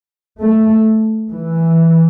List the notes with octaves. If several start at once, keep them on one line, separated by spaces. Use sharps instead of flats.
A3
E3